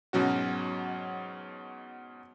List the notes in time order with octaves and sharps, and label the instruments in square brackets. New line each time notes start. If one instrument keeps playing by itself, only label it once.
[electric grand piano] G#2 B2 F#3 C#4 F#4